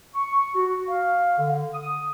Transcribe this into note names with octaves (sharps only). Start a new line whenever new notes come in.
C#6
F#4
F5
D3
D#6